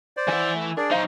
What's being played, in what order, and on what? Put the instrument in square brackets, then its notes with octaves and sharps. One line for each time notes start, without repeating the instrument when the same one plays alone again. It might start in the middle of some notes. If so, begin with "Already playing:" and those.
[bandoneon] C5 D5
[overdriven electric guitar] E3 E5 [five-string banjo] F#5 G#5
[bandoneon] A3
[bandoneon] D4 G#4 D5 [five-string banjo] A#4
[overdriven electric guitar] F#3 D#4 [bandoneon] C5 [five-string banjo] F5